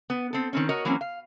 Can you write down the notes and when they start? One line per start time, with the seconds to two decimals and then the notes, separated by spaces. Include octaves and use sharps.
0.10 B3
0.33 C4 A4
0.53 D#3 C4 C#4
0.69 F#4 A#4 C#5 D#5
0.85 E3 F#3 A#3 C4 C#4
1.01 F5